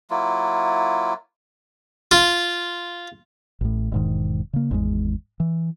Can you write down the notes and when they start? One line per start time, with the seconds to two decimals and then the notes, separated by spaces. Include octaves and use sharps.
0.10 F#3 A#3 E4 F4
2.11 F4
3.61 A1 A2
3.92 E1 G#2 D#3
4.53 C#3 A#3
4.71 G#1 E2 G#3
5.40 E3